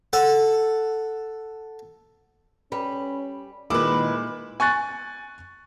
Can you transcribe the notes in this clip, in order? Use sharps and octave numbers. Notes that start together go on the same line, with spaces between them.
A4 F#5
G3 C#4 B4
A#2 D#3 G#3 E4 B4 D6
G#5 C#6 F#6 A6